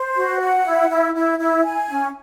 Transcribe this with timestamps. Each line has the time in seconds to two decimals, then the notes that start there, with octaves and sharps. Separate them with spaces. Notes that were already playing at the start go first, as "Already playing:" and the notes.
Already playing: C5
0.16 F#4
0.40 F#5
0.65 E4
0.89 E4
1.14 E4
1.38 E4
1.63 G#5
1.88 C#4